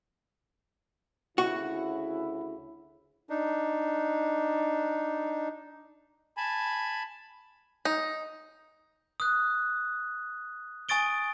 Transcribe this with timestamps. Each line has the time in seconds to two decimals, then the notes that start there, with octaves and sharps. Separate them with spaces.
1.38 D2 C#3 E4 F#4
3.30 D4 D#4
6.37 G#5 A5 B5
7.85 D#4
9.20 D#6 F#6
10.89 G#5 C#6 D#6 A6 D7 G7